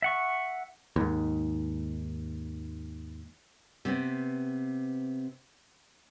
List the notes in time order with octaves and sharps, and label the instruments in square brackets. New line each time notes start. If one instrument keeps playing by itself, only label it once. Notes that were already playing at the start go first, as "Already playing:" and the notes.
[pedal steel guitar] E5 F#5 C#6
[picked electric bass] D#2 G#2
[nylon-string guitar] C3 B3 C4